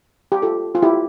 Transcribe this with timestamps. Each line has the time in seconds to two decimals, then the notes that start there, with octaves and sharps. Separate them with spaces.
0.32 G4
0.42 F4 A4
0.75 F4
0.82 E4 G4